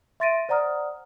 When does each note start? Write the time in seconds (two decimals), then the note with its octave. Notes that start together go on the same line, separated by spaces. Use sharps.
0.20 E5 C6 A6 A#6 D7 D#7
0.49 C5 D5 F#5 A#5 D#6 F6